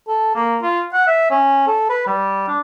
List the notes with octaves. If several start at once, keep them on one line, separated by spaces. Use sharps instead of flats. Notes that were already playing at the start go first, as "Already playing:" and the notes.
A4
A#3
F4
F#5
E5
C#4
A4
B4
G3
D4